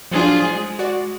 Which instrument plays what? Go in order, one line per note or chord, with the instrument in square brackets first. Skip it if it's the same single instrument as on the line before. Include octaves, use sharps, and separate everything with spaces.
[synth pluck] F3 F#3 D4 [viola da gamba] F4 G#4 C5
[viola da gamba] G#3
[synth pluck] F#4 D5